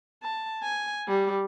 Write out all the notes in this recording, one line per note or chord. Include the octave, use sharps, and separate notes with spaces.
A5
G#5
G3